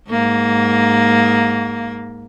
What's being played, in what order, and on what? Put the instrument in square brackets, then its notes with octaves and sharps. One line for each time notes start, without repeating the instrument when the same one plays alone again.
[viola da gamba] G#2 A#3